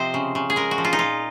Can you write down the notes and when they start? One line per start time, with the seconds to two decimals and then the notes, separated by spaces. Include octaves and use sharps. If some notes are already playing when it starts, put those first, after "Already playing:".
Already playing: C3 F3 C5 D#5
0.14 C#3
0.35 C#3
0.50 G#4
0.56 G#3 A#4
0.71 F#4
0.78 F3
0.85 F4
0.93 D#4
0.99 A#2 F4